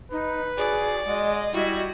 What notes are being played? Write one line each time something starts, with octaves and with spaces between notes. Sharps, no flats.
D#4 B4
F#4 G#4 D5
G#3 D#5 F#5
G3 E4 F#4